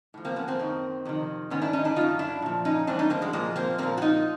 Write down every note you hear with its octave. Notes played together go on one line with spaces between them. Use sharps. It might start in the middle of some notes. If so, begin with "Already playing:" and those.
A2 F3
A#3 C4
B3 C#4
A#3 C4
F#2 D#3
F2 C3 D#3
G#2 D#3 B3 C#4
D4 E4
C#4 D#4
D4 E4
F#2 D#3 D#4 F4
D4 E4
A#2 F3
C#4 D#4
G2 E3 C4 D4
C#4 D#4
A#3 C4
F#3 G#3
A#2 F3 G#3 A#3
A#3 C4
A#2 F3 A#3 C4
F#4
D#4 F4